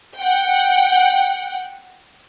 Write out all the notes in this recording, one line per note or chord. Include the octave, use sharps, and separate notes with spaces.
F#5 G5